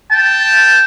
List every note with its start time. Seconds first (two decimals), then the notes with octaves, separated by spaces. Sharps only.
0.12 G5 A5